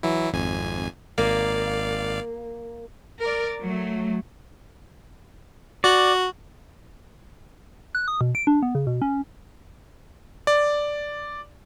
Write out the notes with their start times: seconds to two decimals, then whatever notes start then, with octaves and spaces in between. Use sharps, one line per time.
0.03 E3 F#3 E4
0.32 G#1 F2 G#5
1.18 G#1 A#3 D5 F5
3.20 A#4 D5
3.61 F#3 A3
5.84 F#4 D5
7.95 F#6
8.08 D#6
8.21 B2
8.35 D7
8.47 D4
8.62 B3
8.75 C#3
8.87 B2
9.02 C#4
10.47 D5